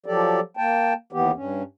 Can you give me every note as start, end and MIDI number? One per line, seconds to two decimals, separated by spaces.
0.06 0.40 53
0.06 0.40 54
0.06 0.40 67
0.06 0.40 69
0.06 0.40 74
0.57 0.93 58
0.57 0.93 79
0.57 0.93 81
1.13 1.31 39
1.13 1.31 52
1.13 1.31 59
1.13 1.31 67
1.35 1.63 43
1.35 1.63 61